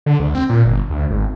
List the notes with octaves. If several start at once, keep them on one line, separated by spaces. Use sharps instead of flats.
D3
D2
C4
A#2
G1
D2
G#1